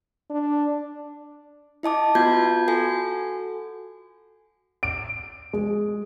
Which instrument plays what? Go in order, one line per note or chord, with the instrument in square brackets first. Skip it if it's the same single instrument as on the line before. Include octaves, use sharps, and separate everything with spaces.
[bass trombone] D4
[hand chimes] E4 D#5 A5 D6
B3 F4 F#4 A5 G6 G#6
F#4 A4 G#5
[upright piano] D7
G#3